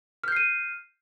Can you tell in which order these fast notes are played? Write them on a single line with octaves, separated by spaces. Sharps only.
F6 G6 C7 D#7